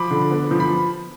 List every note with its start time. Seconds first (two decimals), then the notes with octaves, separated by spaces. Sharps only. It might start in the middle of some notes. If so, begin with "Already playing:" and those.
Already playing: F3 B5 D6
0.10 D3
0.31 B3
0.51 F3
0.60 B5